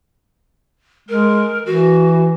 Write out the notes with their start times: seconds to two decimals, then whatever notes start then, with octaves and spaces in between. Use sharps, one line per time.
1.09 G#3 A#4
1.66 E3 F#4